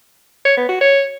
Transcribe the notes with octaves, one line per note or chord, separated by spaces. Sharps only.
C#5
B3
F#4
C#5